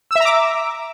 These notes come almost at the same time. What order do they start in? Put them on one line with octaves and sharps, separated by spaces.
E6 E5 A#5 D6